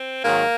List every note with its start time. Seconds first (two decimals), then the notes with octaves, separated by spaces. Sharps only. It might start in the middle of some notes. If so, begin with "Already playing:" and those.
Already playing: C4
0.25 G#2 D#3 F#3 A#3